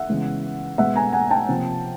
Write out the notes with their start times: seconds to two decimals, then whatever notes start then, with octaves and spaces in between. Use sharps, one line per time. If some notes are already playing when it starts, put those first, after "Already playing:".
Already playing: E5 F#5
0.09 C#3 E3 G#3 B3
0.78 B2 G#3 B3 E5 F#5
0.96 G#5 A#5
1.13 F#5 G#5
1.30 G5 A5
1.48 C3 F3 A#3